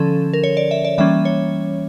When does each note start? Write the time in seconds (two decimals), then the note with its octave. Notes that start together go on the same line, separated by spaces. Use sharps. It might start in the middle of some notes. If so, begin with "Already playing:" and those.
Already playing: D3 F3 C#4 A4
0.33 A#4
0.44 C#5
0.57 D5
0.71 E5
0.85 D5
0.98 E3 G3 A#3 C#4 E5
1.25 C#5